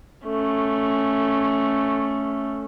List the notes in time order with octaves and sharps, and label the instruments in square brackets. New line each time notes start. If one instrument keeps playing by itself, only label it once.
[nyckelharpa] A3 C#4